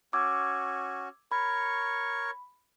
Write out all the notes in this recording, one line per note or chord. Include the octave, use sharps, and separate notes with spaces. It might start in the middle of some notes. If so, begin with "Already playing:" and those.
C#4 F#4 D6 E6 G#6
A#4 C#5 B5 C#6